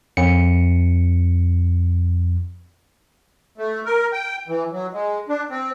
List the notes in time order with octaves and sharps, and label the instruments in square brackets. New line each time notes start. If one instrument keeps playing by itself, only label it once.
[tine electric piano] F2 C#7
[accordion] A3
A#4
G5
E3
F#3
G#3
D4
C4